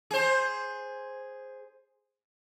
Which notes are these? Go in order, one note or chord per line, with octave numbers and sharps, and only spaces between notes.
G#4 C5